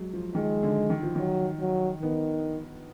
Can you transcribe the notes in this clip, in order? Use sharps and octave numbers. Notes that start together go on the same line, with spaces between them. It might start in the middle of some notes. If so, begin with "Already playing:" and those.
Already playing: F#3 G#3
F3
D#3 G#3
D3
D#3
F3
D#3 F#3
F#3
D#3 B3